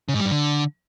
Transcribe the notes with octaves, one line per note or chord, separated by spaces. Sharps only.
C#3
G#2
G3
G2
D3